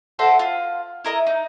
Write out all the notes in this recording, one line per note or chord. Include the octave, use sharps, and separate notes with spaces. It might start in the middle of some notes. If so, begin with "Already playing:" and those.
F#4 A4 C5 E5
F4
E4 A#4 D#5
D#4